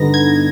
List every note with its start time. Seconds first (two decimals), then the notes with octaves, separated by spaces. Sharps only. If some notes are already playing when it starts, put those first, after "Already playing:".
Already playing: G2 D3 B3 D#4 A#6
0.14 G#6